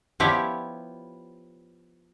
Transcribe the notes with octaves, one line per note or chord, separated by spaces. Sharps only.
F3 B3 E4 G4 C#5 D5